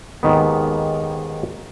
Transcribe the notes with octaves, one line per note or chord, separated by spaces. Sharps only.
D#2 G#2 D#3 B3